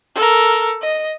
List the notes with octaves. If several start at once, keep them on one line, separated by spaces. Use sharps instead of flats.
A4 A#4
D#5